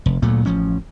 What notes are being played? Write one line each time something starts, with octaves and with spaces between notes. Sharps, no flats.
F1
D2 A#2 F#3 A3
A1 F3 C#4